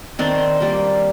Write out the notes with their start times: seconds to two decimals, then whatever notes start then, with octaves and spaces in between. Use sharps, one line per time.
0.19 D#3 C4 D4
0.60 G3 A#3